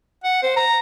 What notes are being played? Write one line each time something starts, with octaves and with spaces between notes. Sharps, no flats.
F#5
C5
A#5